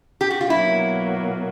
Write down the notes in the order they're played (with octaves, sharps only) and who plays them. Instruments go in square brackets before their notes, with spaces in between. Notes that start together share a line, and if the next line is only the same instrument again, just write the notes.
[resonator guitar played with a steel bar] G4
F#4
F4
[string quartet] B2 F#3 A#3 [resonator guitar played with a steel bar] E4